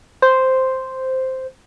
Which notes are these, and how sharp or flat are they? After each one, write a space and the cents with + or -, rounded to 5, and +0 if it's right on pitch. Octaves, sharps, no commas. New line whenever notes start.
C5 -5